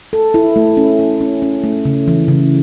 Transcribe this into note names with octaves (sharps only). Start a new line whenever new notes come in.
A4
E4
A3
C#4
E4
C#4
C#4
A3
C#3
E3
C#3